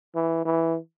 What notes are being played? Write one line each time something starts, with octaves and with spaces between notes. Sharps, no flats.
E3
E3